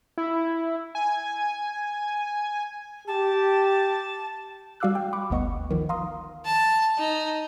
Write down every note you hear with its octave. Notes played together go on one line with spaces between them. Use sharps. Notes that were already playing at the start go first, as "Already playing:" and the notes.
E4
G#5
G4 A5
G3 F#4 F5 D6 E6 F#6
G5
B5 C#6 D6 F#6
G1 D2 B3 D#5 C#6 C#7
D#3 F3
F5 A#5 C6 D#6
A5
D#4